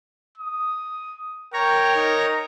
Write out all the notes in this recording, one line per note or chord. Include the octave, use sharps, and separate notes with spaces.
D#6
A#4 C#5 G5 A#5
D#4